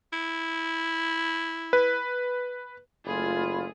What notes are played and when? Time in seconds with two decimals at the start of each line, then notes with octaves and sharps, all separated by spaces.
0.13 E4
1.73 B4
3.06 F#1 A3 F4 G#4 B5